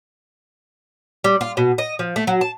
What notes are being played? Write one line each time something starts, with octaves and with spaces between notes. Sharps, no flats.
G3
F4
B2
D#5
F3
A3
F#3
A5